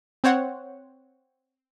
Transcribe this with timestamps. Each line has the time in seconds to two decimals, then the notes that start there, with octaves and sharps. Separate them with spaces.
0.24 C4 C5 C#5 F#5